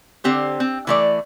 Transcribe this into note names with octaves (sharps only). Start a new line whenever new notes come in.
D3 C4 G4 C5
C4
E3 A3 D5